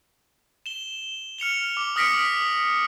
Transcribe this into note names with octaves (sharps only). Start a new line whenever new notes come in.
E7 G7
F6 C#7 F7 G7
D6
D#6 F6 A#6 B6 C#7 D7